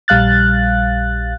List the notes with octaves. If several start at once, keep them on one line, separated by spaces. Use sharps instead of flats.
A#1 G3 F5 F#6 A6